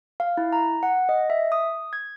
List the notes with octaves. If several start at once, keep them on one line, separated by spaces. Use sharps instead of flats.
F5
E4
A#5
F#5
D#5
E5
D#6
G#6